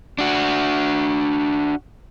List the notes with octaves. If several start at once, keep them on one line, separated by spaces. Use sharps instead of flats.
D4 F#4